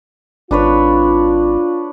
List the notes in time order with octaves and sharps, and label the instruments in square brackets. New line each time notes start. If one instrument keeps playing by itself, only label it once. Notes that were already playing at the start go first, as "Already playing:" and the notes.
[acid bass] G#1 [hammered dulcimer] D4 B4 C#5 [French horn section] F4